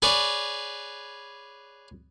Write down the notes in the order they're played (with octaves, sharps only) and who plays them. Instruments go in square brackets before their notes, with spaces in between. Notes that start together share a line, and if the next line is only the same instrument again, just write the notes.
[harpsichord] G#4 B4 C#5 D5